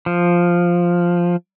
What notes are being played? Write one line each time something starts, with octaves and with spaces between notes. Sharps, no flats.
F3